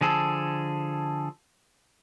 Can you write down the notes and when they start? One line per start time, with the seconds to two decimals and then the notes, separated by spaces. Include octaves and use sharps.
0.01 D3 F3 G#4 A4